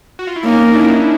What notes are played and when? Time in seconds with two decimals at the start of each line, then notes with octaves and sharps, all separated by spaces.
0.19 F#4
0.27 F4
0.36 E4
0.45 A#3 C#4 D#4
0.74 D4 E4